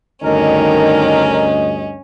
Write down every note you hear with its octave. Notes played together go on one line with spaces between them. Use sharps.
D2 G2 D#3 C#4 D4 A#4 D#5